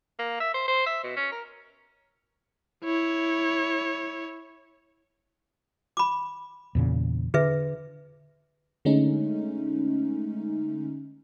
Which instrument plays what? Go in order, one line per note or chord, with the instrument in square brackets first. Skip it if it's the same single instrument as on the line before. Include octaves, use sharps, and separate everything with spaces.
[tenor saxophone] A#3
E5
C5
C5
E5
B2
C#4
A#4
[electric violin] E4 C#5
[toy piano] B5 D6
[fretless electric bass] E2 A#2 C#3
[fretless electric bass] D3 [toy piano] G#4 B4 E5
[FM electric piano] D3 G#3 A3 C#4 D#4